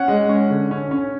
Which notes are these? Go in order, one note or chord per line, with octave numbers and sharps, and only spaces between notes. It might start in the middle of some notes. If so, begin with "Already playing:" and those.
Already playing: C#4 F#5
G#3
C#4
D3
C#4
C#4